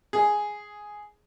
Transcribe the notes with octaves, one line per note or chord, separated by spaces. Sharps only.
G#4